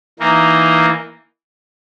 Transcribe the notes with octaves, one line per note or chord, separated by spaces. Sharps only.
E3 A#3 D#4